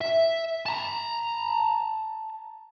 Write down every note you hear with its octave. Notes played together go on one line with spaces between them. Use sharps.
E5
A5 A#5